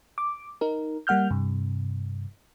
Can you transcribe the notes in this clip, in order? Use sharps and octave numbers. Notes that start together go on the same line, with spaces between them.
D6
D#4 A#4
G3 A#3 F#5 F6 G6
G2 C3